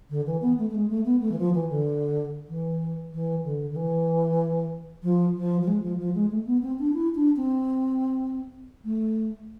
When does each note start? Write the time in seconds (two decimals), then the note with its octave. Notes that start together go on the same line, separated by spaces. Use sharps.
0.09 D3
0.25 E3
0.41 B3
0.57 A3
0.69 A3
0.74 G#3
0.89 A3
1.05 B3
1.20 A3
1.31 E3
1.38 F3
1.53 E3
1.69 D3
2.48 E3
3.13 E3
3.43 D3
3.70 D3
3.75 E3
5.03 F3
5.35 F3
5.61 F3
5.67 G#3
5.82 F3
5.98 F3
6.14 G#3
6.31 A3
6.46 B3
6.62 C4
6.78 D4
6.93 E4
7.14 D4
7.36 C4
8.84 A3